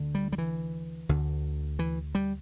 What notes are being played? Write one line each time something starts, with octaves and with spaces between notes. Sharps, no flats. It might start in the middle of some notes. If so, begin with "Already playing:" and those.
Already playing: D2 D3
G3
G3
E3
D2 D3
E3
G3